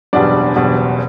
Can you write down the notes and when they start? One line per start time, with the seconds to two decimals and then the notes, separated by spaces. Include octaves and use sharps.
0.13 F#1 E2 B2 G3 D4 D5
0.56 F#1 E2 B2 G3